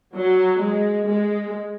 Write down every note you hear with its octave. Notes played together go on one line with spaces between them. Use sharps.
F#3
G#3
G#3